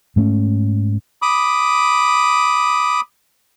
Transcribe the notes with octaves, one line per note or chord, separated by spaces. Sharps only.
G#2 A3 C4 C#4
B5 D6 D#6